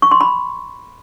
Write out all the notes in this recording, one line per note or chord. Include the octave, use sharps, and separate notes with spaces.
C#6
C6
B5